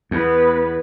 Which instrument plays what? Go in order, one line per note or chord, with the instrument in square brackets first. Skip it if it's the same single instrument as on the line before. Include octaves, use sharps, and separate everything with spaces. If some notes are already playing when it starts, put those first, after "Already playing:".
[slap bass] E2 [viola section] B3 B4